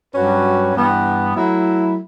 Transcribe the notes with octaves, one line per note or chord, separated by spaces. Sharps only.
G2 F#3 C#4 F#4 B4
G2 E3 B3
F#3 A3 E4